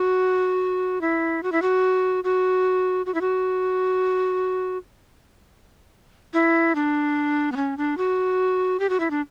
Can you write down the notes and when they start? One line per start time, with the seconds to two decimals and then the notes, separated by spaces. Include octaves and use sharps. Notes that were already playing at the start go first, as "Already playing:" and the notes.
Already playing: F#4
1.01 E4
1.43 F#4
1.52 E4
1.62 F#4
2.24 F#4
3.06 F#4
3.14 E4
3.21 F#4
6.33 E4
6.75 D4
7.52 B3
7.56 C#4
7.77 D4
7.97 F#4
8.80 G4
8.90 F#4
9.00 E4
9.11 D4